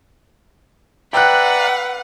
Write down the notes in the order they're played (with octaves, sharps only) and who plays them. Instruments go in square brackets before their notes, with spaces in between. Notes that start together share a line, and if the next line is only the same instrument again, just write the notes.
[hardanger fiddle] B4 [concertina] D5 E5 A#5 [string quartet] F#5 [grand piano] G5 F#6